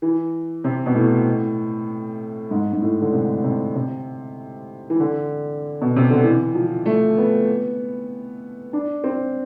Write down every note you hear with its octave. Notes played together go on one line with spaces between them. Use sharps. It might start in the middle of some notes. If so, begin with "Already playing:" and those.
E3
C3
B2
A2
G#2
G#2
A2
D3
C3
C3
C3
E3
D3
B2
C3
D3
E3
F3
A3
B3
D4
C4